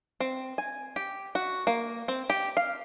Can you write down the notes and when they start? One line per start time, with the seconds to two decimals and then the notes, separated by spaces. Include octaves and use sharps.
0.20 C4
0.58 G#5
0.96 G4
1.35 F#4
1.67 A#3
2.08 C4
2.30 G4
2.57 F5